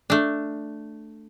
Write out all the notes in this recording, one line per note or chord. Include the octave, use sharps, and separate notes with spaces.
A3 D4